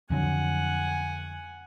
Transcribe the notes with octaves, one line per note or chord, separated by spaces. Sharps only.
F2 D3 F#3 F#5 G#5